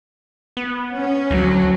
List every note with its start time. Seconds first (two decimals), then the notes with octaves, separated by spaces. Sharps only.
0.57 B3
0.94 C#4
1.31 D2 F#3